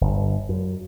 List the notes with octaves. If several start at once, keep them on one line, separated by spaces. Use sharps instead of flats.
G1
F#2